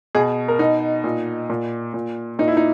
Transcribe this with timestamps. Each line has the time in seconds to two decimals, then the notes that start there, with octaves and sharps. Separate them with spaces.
0.15 B2 G#4
0.48 A#4
0.59 B2 D#4
1.04 A#2
1.50 A#2
1.94 A#2
2.39 A#2 D#4
2.48 E4
2.57 D#4